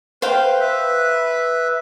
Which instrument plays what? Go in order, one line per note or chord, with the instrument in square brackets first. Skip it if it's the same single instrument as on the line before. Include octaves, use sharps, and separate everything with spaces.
[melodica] B4 [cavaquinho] C5 F5 G5
[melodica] B4 E5